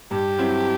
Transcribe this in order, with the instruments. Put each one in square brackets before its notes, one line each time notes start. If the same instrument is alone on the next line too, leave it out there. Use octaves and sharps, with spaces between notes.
[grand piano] G2 [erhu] G4
[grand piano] F#3 C4 E4